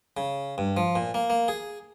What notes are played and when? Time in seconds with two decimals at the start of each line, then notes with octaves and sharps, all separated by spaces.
0.17 C#3
0.58 G2
0.77 F3
0.95 A#2
1.14 A#3
1.30 A#3
1.48 G#4